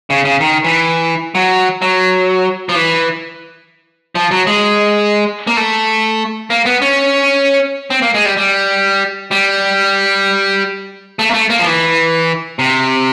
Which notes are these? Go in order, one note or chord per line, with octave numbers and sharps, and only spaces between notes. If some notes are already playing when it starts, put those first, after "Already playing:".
C#3
C#3
D#3
E3
F#3
F#3
F3
E3
F3
F#3
G#3
A#3
A3
A#3
B3
C#4
C4
A#3
G#3
G3
G3
G3
A3
A#3
A3
A#3
F3
E3
C3